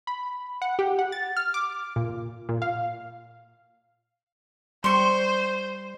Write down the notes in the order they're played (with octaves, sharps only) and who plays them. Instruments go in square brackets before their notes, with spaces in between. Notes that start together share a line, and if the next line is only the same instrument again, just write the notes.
[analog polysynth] B5
F#5
G4
F#5
A6
F6
D6
A#2
A#2
F5
[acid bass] G3 [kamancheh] C5 [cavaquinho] C6 C#6